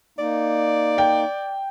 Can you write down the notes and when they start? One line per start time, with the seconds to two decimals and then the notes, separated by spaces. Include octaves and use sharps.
0.19 A#3 D#4 D5
0.98 G5